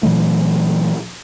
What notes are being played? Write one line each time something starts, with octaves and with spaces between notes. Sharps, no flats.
A#2 E3 F#3 A3